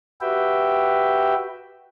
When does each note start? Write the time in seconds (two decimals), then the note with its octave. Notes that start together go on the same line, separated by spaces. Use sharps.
0.21 F#4 G4 B4 E5 G5